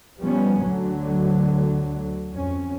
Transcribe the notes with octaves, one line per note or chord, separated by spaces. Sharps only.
F3 G3 B3 C#4
D2 D3 F#3
F2 C#4